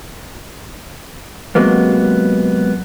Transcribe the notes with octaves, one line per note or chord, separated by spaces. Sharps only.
C3 F#3 G#3 A#3 B3